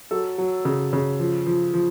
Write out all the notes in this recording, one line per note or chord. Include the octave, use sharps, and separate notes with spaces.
F#3 A4
F#3
C#3
C#3
F3
F3
F3